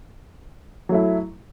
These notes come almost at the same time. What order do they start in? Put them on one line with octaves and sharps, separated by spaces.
F#3 A3 E4